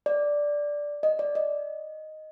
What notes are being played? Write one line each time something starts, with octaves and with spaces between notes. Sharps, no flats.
D5
D#5
D5
D#5